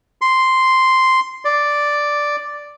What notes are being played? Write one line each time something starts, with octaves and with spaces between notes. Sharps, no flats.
C6
D5